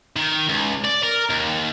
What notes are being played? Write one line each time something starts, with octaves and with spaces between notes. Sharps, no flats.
D#3
C#2
D5
A#4
D#2